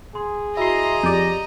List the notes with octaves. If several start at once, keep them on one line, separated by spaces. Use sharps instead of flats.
G#4 C6
E4 F#4 D#5 A#5 C6 E6
F2 G4 D5 G6